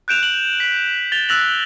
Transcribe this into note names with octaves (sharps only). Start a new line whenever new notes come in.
F#6 G6 D7 E7 F7
F#7
B6
A6 F7 G7
E6 F#6 A6 A#6 F7 F#7